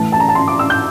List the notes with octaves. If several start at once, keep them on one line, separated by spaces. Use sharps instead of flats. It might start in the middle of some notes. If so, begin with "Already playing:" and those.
Already playing: A2 E3 A5
A5
A#5
A5
C6
D6
E6
G6